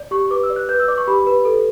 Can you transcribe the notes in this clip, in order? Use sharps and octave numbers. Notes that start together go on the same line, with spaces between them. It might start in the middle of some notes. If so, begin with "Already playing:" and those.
Already playing: D5
G4 C#6
B4 D6
E6
D5
F#6
B4 G6
E6
D5 D6
C#6
G4 B5
B4
A4